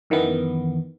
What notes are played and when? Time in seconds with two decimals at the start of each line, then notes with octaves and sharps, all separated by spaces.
0.10 F#2 D#3 E3 B3